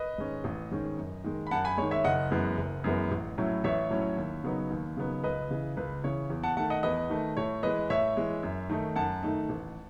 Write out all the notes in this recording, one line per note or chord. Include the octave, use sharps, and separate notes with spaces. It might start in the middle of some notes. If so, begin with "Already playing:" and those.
Already playing: B4 D#5
G#2 D#3 G#3 C#4
A1
G#2 D#3 G#3 C#4
F#2
D#3 G#3
B5
F#2 F#5 A5
G#5 B5
D#3 G#3 C#5
C#5 E5
F#1 D#5 F#5
F#2 E3 G#3 B3
F#1
F#2 E3 G#3 B3
A1
A2 F#3 C#4 E4
A1 C#5 E5
A2 F#3 C#4 E4
D#2
C#3 F#3 B3 D#4
D#2
C#3 F#3 B3 D#4
C#2 B4 D#5
C#3 E3
C#2 B4
C#3 E3 C#5
E2
F#5 A5
D#3 A3 F#5 A5
D#5 F#5
E2 B4 D#5
D#3 A3
A2 C#5
E3 G#3 B4 D#5
A2 C#5 E5
E3 G#3
F#2
D#3 A3 D#4
F#2 F#5 A5
D#3 A3 D#4
A1